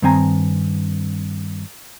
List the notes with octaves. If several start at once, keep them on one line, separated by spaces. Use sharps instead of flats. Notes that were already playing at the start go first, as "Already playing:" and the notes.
G2 D#3 C4 G#5 A#5